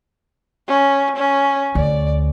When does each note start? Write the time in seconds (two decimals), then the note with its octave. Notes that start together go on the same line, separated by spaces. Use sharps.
0.67 C#4
1.16 C#4
1.75 D2 D5